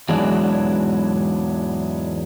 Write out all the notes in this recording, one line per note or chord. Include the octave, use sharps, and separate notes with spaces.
E2 G#2 E3 F#3 G#3 D4